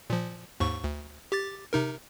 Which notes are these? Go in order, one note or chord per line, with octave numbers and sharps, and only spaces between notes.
A#2 F3
D#2 G#2 C#6
D2
G4 D6 A6
C3 D#4 A#4